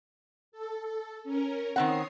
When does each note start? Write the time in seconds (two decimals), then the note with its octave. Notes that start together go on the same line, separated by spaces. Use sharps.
0.52 A4
1.24 C#4 A#4
1.76 D#3 C4 C#5 F#5 D#6 C7